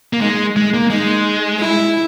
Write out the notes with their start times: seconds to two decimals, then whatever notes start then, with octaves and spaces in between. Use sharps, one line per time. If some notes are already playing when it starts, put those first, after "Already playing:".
0.13 A#3
0.21 G#3 D#4
0.56 G#3
0.74 A#3
0.90 G#3 D#4
1.60 E4